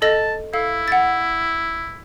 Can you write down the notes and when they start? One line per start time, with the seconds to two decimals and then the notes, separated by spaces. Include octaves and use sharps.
0.02 A4 D#5 A5 A#6
0.53 E4 A4 F5
0.88 F#5 A6